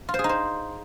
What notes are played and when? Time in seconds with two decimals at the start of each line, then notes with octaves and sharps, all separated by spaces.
0.09 F4
0.14 C5
0.19 G#4
0.24 D#4
0.29 C5